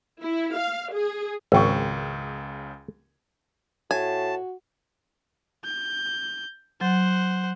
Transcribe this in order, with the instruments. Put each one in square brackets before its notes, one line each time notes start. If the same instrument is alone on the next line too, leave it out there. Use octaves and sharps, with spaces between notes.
[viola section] E4
F5
G#4
[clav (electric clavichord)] G#1 [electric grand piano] C#2 C#3 [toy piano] A#4 G5 C#6
[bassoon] A2 [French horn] F#4 [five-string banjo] G#5 [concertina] A5
[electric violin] G6
[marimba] F#3 [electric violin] C5 F#5